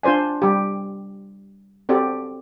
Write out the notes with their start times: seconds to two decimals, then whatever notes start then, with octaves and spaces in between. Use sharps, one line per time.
0.03 D4 F4 C5 D5 G#5
0.42 G3 G4
1.89 C4 F#4 G4 A4 D5